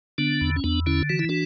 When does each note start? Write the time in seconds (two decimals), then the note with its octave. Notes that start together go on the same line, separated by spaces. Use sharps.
0.18 D3 B3 D4
0.41 E2
0.56 C#4
0.64 E2 B3 D4
0.86 D3 C#4 E4
1.09 E3 F#4
1.19 E4
1.29 D4 F#4